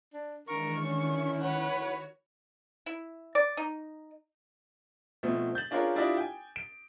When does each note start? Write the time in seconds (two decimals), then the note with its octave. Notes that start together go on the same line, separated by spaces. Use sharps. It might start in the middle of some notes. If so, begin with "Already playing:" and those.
0.13 D4
0.48 D#3 E3 G#3 D4 A#4 C#6
0.84 D#3 C#4 E4
1.41 B4 C#5 F#5
1.73 F#4
2.86 E4
3.35 D5
3.57 D#4
5.23 B2 F3 A3 C4
5.55 G6 A6 F#7
5.71 C#4 D4 F4 G#4 A#4 C#5
5.96 D4 E4 F4 G4 D5 D#5
6.17 G5 G#5
6.56 D7